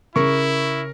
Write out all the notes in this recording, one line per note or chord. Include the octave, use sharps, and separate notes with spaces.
C#3 E4 A#4 C#6